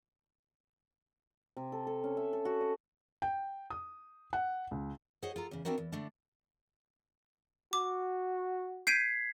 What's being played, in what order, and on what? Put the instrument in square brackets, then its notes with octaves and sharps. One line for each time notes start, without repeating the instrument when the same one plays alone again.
[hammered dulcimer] C3
A4
A4
C#4
E5
A4
F#4
D#5
[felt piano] G5
D#6
F#5
C#2
[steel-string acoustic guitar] G#4 C5 C#5 D#5 F#5
F4 A4 A#5
E2 C#3
B3 C4 D4 E4 F#4 A#4
E2
D3 A3 D4
[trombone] F#4 [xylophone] D6
[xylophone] G6 D7 D#7 [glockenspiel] G#6 B6 C7